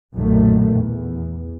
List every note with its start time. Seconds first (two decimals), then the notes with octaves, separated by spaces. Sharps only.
0.14 B1 F#2 A#2 D#3 A3
0.75 E2